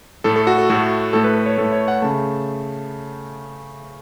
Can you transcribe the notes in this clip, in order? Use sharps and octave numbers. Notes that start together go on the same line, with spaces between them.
A2 A3 A4
A4
F#4
A4
A2 A3 F#4
A2 A3 A4
B4
B4
C#5
A2 A3 A4
C#5
F#5
C#3 A3 A5